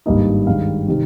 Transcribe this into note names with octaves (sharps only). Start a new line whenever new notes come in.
G#1 G2 G3 A#3 D#4 D#5
G2 D#3 G#3 D#4 F5
C3 D#3